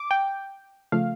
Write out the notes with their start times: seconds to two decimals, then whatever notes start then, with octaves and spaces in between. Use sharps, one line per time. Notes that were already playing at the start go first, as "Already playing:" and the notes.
Already playing: D6
0.11 G5
0.92 C#3 F3 A3 F5